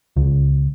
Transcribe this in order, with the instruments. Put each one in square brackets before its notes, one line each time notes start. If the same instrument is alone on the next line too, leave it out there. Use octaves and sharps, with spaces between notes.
[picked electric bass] C#2